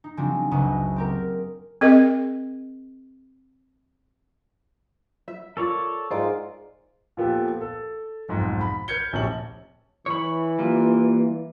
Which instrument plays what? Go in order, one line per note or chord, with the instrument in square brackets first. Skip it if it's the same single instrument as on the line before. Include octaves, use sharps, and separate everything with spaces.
[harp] D#4
C#3 F3 F#3 G#3 C4 D4
F#1 C#2 C#3 F#3 F#5 D#6
C4 G4 A#4
[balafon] C4 G#4 A#4 D#5
[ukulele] E5
[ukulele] F4 A#4 [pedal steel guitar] A4 C#5 D5
[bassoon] G#2 [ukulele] D#4 A#4 D5 [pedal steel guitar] F4
[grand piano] A#2 F3 B3 G4 A4
A4
B1 F2 G#2
B5
B4 F6 G6 G#6 C#7 G7
D1 A#1 C3 C#4 A5 F#7
[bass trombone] E3 [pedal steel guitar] C#5 B5
[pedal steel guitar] G3 A#3 F4